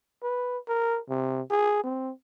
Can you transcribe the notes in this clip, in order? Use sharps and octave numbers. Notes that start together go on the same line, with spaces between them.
B4
A#4
C3
G#4
C4